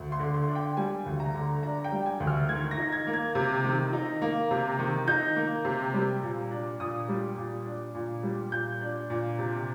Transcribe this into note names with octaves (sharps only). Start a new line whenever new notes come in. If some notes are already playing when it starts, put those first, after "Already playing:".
Already playing: D2
C6
D3
C6
D4
G5
G3 G#5
D2
A#5
D3
D4 A#5
G5
G3
G#5
D2
F6
D#3 G#6
A#6
D#4
G#6
A#3
G#6
C3
D#3
D#4
A#3
C3
D#3
D#4 G6
A#3
C3
G3
A#2
D4
A#2 D#6
G3
A#2
D4
A#2
G3
A#2 G6
D4
A#2
C3